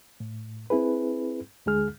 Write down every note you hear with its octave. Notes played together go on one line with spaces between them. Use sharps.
A2
C4 E4 G#4 B4
D2 D3 G#3 G#4 F6